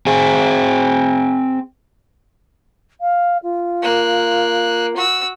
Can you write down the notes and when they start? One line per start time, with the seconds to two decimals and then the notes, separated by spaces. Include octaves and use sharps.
0.06 C4 G#4
3.01 F5
3.43 F4
3.82 A#3 F#6
4.96 F#4 E6